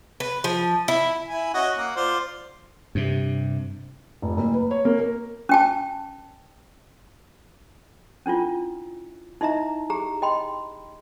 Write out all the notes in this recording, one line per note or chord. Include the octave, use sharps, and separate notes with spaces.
B4
F3
E4
E4 G#5
C#4 F#4 D#5
A#3 F#5
F4 C5 D5
G2 C3
F1
F#1
B4
C#5
A#3
A#4
C#4 G5 A5
C#4 D4 E4 F4
D#4 E4 D#5 E5 A#5
G4 G#4 A#5
D#5 G5 B5 C6